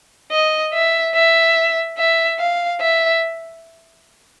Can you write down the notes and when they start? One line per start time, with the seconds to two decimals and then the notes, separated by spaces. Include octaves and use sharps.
0.31 D#5
0.73 E5
1.15 E5
1.98 E5
2.40 F5
2.81 E5